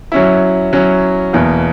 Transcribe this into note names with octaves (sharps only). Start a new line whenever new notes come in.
F#3 C#4 E4
F#3 C#4 E4
E2 B2 A#3